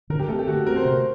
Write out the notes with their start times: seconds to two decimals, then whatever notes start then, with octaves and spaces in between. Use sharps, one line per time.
0.10 D3 A#4
0.19 G4
0.28 A3 A4
0.32 C4
0.39 G4
0.47 D3 F#4
0.67 A3 C4 A#4
0.76 C5
0.85 C3